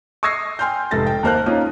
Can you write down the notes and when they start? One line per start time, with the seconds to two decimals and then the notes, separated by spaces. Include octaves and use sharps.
0.23 C#6 D#6 E6 G#6 A#6 C7
0.59 G5 G#5 C6 F6 G6
0.91 F1 G#2 A4 A6 A#6
1.06 G5
1.23 D#2 A#3 A#4 C5 A5 F#6
1.46 A#3 C#4 D#4 F4